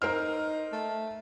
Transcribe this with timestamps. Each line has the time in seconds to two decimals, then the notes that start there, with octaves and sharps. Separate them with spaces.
0.02 D#4 A#4 C5 F6
0.72 A3